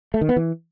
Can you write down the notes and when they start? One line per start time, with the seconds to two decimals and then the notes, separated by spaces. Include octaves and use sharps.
0.14 A3
0.21 D#3
0.29 B3
0.36 E3